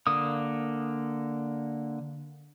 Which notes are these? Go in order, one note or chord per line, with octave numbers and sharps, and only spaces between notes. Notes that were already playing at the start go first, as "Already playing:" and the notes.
D3 A#3 D#6